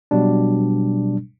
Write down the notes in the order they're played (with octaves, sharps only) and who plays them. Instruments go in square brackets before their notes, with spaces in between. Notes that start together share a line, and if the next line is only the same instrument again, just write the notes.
[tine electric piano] B2 F#3 G3 D4